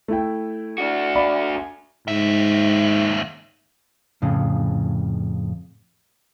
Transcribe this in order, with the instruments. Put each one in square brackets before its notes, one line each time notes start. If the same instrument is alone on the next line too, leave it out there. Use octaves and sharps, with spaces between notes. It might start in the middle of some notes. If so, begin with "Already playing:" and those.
[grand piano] A3 E4 G5
[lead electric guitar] D4 F#4
[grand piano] D5 F5 B5
G#5
[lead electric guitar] D#2 E5 [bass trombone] G#2
[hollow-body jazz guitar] F2 A2 C#3